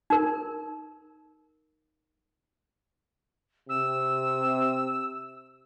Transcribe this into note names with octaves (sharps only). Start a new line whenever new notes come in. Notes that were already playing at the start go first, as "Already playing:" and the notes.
D#4 A#4
C3 E6